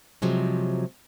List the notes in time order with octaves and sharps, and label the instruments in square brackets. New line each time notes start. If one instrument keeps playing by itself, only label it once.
[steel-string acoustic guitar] C3 F3 F#3 G#3